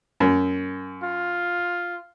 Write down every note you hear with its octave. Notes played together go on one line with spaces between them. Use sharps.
F#2
F4